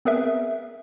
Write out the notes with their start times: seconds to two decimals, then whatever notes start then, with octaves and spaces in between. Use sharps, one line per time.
0.05 B3 C4 G#4 A#4 B4 E5